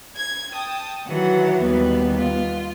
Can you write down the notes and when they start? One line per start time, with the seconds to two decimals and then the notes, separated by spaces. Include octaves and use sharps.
0.17 G#6
0.53 G5 A5 D#6
1.06 D#3 E3 F#3 F#5
1.61 D#2 G3 B3
2.16 F4